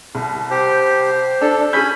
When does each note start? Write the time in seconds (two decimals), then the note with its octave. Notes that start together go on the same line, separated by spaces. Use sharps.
0.15 C2
0.51 G4 C5
1.41 D4 A4
1.73 C#4 G#4 B5 G6